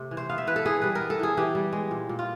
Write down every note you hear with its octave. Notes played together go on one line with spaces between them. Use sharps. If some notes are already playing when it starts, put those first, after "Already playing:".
Already playing: C3 A3
E3
C5
B3 F5
E5
E3 B4
A4
E3 G#4
G3 B4
A#4
B3
A4
E3 G#4
E3 G4
G3
G#3
A#2
A#2
F4